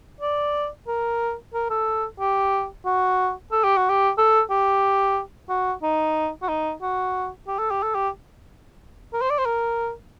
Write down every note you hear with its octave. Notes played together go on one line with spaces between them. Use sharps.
D5
A#4
A#4
A4
G4
F#4
A4
G4
F#4
G4
A4
G4
F#4
D#4
F#4
D#4
F#4
G4
A4
G4
A4
G4
A#4
C5
D5
C5
A#4